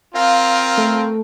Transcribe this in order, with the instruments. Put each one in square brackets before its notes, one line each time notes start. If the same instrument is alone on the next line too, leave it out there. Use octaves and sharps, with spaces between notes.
[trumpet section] C4 F4 A#4 [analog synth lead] F5
[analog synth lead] A3